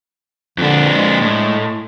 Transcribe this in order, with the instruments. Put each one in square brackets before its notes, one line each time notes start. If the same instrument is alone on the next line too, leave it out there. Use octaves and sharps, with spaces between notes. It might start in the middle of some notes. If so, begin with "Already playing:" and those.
[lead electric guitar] F2 D4 [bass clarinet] D3
[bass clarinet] G#3
[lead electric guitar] A2